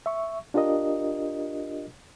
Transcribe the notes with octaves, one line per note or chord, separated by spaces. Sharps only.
E5 C#6
D4 F4 G4 A#4 D#5